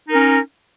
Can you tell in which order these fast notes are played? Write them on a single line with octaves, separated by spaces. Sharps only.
D#4 A#4 C#4